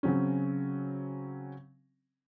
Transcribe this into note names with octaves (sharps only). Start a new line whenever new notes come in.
C#3 F#3 C4 C#4